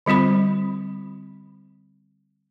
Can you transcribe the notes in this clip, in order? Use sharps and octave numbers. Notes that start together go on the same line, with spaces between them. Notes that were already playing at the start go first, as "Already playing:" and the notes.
D3 G3 C4 F4 B5